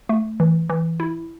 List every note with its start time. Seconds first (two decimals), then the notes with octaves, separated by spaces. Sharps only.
0.09 A3
0.40 E3
0.69 E3
1.00 E4